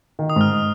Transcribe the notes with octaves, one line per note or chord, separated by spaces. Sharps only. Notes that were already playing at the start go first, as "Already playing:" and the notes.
D#3
D#6
G#2 F6